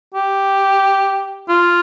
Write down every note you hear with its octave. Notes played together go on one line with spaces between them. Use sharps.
G4
F4